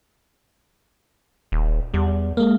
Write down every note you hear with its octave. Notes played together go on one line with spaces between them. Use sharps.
D#1
E2 G3
G#3 A#3